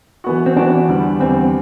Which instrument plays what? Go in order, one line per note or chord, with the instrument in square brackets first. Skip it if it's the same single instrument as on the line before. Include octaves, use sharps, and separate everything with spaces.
[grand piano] E3 B3 F#4
[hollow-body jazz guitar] C4
[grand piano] E3 B3 F#4 [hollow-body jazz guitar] D4
[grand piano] E2 D3 G3
[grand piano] E2 D3 G3 [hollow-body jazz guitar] C4